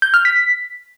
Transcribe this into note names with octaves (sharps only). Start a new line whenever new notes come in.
G6
F6
B6